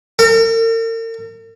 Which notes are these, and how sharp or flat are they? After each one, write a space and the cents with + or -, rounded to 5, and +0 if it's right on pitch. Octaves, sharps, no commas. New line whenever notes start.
A#4 -45